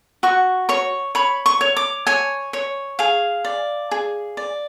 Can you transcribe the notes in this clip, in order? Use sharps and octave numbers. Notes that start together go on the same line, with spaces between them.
F#4 C#6
C#5 C#6
C#5 B5
C#6
C#5
D6
C#5 G#5
C#5
G#4 F5
D5
G#4
D5